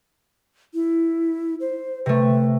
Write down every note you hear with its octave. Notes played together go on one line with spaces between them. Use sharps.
E4
C5
C3 A3 B4